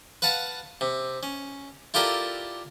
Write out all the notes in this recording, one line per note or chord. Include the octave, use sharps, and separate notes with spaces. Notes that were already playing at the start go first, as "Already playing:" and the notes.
B4 F5 F#5 A5
C3
C#4
E4 F4 G4 A4 A#4 D5